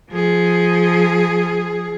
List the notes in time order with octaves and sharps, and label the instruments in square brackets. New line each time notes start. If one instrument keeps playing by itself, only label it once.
[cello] F3 G#4